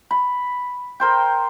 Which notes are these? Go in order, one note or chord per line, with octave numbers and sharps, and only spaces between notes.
B5
A#4 C5 G5